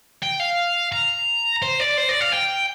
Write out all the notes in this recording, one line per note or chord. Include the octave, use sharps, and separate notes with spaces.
G5
F5
A#5
C5
D5
C5
D5
F5
G5